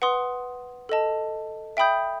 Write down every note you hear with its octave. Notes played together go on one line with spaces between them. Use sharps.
B4 F#5 C6 D#6
A4 D#5 A5
E5 G5 B5 D#6 G6